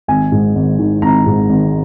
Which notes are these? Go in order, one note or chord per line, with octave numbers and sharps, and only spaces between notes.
G#1 G#5
G#2
G#1
D#3
G#1 A#5
G#2
G#1